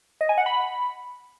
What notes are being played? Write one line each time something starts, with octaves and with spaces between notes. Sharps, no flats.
D#5
G#5
F#5
B5